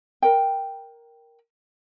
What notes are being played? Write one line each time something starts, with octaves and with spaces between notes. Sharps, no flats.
A#4 G5